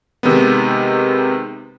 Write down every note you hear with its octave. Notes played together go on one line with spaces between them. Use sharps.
C3 D#3 G#3 B3